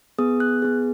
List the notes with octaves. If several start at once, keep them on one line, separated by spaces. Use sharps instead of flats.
B3 G#4 D#6
F#6
B3 G#4